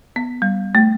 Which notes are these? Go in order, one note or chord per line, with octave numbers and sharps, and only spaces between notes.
B3
G3
A3